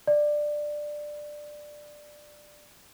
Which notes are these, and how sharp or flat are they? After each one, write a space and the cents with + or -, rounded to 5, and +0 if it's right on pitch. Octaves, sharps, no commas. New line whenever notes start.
D5 +15